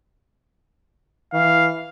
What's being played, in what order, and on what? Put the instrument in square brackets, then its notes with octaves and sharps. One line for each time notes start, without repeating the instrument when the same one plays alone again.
[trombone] E3 [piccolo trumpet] F5